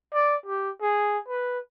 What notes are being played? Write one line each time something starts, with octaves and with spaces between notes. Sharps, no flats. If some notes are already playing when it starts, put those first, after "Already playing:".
D5
G4
G#4
B4